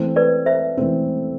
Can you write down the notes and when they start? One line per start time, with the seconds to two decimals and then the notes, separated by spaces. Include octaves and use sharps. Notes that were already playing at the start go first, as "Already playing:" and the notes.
Already playing: E3 A3 C4
0.16 B4 D5
0.46 C5 E5
0.77 E3 A3 C4